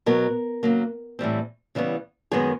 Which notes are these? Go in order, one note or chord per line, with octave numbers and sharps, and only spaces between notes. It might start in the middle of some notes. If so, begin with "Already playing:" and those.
B2 F#3 B3 A#4
C#3 F#3 A#3
A2 E3 G3 C4
C#3 E3 G3 B3
F#2 D#3 G#3 B3 G#4